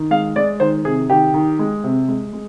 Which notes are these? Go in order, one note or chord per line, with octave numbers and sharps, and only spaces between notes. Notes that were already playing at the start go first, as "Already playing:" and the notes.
Already playing: D#3
G#3 F5
G#3 D5
D#3 C5
C3 G#4
D#3 G4
D#3
G#3
C3
G#3
G#3